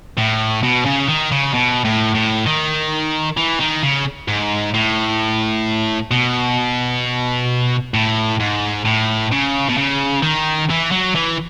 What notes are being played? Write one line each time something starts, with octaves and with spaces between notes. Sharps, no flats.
A2
B2
C#3
D#3
C#3
B2
A2
A2
D#3
E3
D#3
C#3
G#2
A2
B2
A2
G#2
A2
C#3
B2
C#3
D#3
E3
F#3
E3